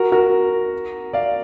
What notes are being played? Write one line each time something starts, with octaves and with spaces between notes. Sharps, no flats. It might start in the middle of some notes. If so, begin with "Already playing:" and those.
Already playing: F#4 A#4
F#4 A#4
D5 F5